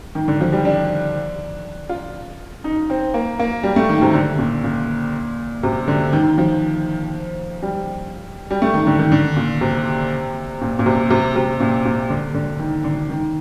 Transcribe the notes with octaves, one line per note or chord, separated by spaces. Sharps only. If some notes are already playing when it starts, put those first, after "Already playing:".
D#3
D3
F3
G3
D4
F4
D#4
C4
A#3
A#3
G3
A3
D#3
C3
D3
A#2
A#2
C3
D3
D#3
F3
G3
G3
A3
D#3
D3
D#3
D3
A#2
C3
A#2
A#2
C3
C3
C3
A#2
A#2
D3
D3
D#3
D3
D#3